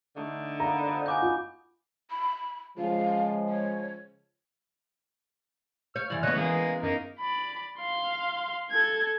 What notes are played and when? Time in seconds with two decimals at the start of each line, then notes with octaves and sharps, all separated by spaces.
0.16 D3 A3 D4 D#4
0.60 A#3 B3 A#5
0.87 F3 D#4 B4
1.06 B3 F#4 G#5 A5 D6 G6
1.22 F4
2.11 B5
2.78 C#3 F3 G#3 F5
3.48 C#5
5.96 C#5 F6 G6
6.10 F#2 E3 D5
6.23 C#3 B3 C#5 D#5 F#6
6.36 E3 G#3 A#3 G#4
6.83 F#2 A#3 D#4 A#4
7.19 D5 B5
7.79 F5 C6
8.71 A4 G#6